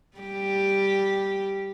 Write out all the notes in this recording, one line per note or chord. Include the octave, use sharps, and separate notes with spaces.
G3 G4